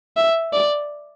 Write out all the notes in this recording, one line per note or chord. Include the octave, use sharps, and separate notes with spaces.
E5
D5